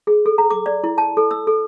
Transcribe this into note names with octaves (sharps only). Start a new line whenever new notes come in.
G#4
A4
A#5
D6
D5
E4
A5
A4
E6
A4